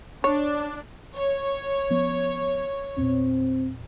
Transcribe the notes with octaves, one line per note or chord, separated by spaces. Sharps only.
D4 C#5
C#5
F3 B3 C#4
E2 A#2 C4